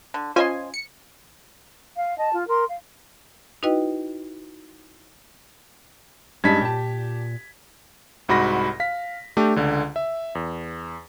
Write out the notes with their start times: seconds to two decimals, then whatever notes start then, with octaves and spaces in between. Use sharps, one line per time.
0.14 D3
0.36 C#4 F4 C5 D#5 G#5 C6
0.74 C#7
1.98 F5
2.16 D#5 A5
2.34 F4
2.48 A#4 C6
2.68 F5
3.63 D#4 E4 F#4 B4 D#5 G5
6.44 G2 G3 G#3 C#4 D#4 G#6 B6
6.61 A#2 G4 A5
8.29 C2 G#2 F#4 B5 A#6
8.80 F5 B6
9.37 A3 D4 G4
9.56 C#2 D3
9.96 E5
10.35 E2